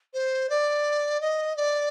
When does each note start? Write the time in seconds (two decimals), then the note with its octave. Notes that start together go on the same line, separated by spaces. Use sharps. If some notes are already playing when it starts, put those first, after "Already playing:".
0.13 C5
0.49 D5
1.20 D#5
1.56 D5